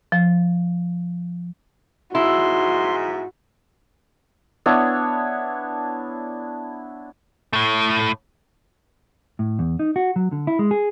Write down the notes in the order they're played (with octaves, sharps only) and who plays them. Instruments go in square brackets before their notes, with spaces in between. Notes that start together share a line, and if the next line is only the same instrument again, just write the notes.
[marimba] F3
[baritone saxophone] G#2 [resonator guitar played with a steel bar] E4 [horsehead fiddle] F#4 [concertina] C6
[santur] B3 D4 E4 C#5
[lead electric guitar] A2 A3
[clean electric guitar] A2
E2
D#4
F#4
F#3
D3
E4
G#3
G#4